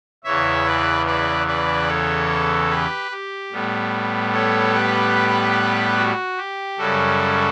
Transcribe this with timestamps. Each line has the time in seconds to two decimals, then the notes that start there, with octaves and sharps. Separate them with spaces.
0.24 E2 C#3 E3 C#5 E5
0.65 B4 D5
1.06 B4 D5
1.47 B4 D5
1.88 A4 C#5
2.70 G4 B4
3.11 G4
3.52 A2 G3 B3
4.33 A4 C#5
4.73 G4 B4
5.97 F#4
6.37 G4
6.78 F#2 C#3 G3 F#4 A4